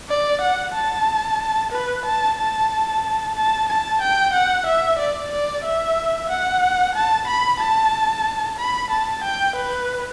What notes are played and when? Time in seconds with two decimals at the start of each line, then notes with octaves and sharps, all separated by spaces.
0.09 D5
0.41 F#5
0.74 A5
1.72 B4
2.05 A5
2.38 A5
3.36 A5
3.69 A5
4.02 G5
4.33 F#5
4.66 E5
4.99 D5
5.32 D5
5.64 E5
6.30 F#5
6.95 A5
7.28 B5
7.60 A5
8.59 B5
8.90 A5
9.24 G5
9.56 B4